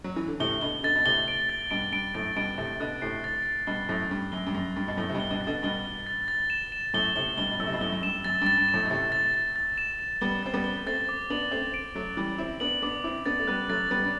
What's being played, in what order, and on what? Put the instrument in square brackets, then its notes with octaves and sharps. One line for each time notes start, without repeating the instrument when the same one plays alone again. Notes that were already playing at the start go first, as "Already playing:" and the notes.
[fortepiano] F#3
E3
D3
[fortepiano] A2 C3 [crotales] G7
[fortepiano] B2 D3 [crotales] G7
[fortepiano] B2 D3 [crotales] A6
[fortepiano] B2
[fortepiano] A2 C3 [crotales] G7
[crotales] D7
A6
[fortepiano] G2 B2 [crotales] D7
[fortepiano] G2 [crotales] D7
[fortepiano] F#2 A2 [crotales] A6
[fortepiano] G2 B2 [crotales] D7
[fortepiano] A2 C3 [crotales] A6
[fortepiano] B2 D3 [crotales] F#6
[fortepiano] A2 C3 [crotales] C7
[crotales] A6
A6
[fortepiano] G2 B2 [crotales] G7
[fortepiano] F#2 A2 [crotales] A6
[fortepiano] G2 [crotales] A6
[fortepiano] F#2 [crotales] G7
[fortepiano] G2
[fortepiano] F#2 [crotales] A6
[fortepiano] G2 [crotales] A6
[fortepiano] B2
[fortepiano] F#2 A2 [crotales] G7
[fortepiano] C3
G2 B2
[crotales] G7
[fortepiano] G2 B2
[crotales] A6
[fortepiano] B2 D3
[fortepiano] G2 B2 [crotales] G7
[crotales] G7
A6
A6
E7
E7
[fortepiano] F#2 A2 [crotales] G7
[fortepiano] A2 C3 [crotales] G7
[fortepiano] G2 B2 [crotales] G7
[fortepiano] B2
[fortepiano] F#2 A2 [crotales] E6
[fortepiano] C3
B2
[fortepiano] F#2 A2 [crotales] G7
[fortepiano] F#2
[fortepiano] G2 [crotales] E7
[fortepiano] F#2 [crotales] A6
[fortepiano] G2
[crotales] A6
[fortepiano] G2
[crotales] E7
[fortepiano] F#2 A2
B2
[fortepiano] A2 C3 [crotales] A6
[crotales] A6
A6
A6
E7
E7
[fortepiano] G3 B3 [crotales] G7
[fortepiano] C4 [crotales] A6
[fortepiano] G3 B3
[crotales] G7
[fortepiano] A3 C4 [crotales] A6
[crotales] D6
[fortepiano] B3 D4 [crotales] F#7
[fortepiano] A3 C4 [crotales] D6
[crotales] D7
[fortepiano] F#3 A3 [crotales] D7
[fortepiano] E3 G3 [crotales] D6
[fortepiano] C4 E4 [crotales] D6
[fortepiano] B3 D4 [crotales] F#7
[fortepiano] B3 D4 [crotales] D6
[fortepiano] C4 E4 [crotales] D6
[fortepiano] B3 D4 [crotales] A6
[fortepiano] A3
[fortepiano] G3 B3 [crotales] F#6
[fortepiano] F#3 A3 [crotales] A6
[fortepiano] G3 B3 [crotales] A6
[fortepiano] D4